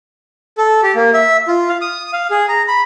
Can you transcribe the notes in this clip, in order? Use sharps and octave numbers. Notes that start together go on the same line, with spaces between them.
A4
G4
A#3
E5
F4
F5
D#6
F5
G#4
A#5
B5